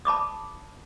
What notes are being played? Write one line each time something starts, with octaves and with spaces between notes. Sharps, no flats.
A5 B5 D6 D#6